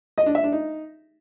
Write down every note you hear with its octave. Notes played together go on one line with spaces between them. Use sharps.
D#5
D4
E5
D4
D#4